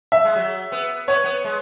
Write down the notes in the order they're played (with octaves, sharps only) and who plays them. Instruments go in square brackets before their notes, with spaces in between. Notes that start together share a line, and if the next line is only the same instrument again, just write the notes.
[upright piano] E5
[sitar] G#3
F#3
B3
[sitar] B3 [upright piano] C#5
[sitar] B3
G#3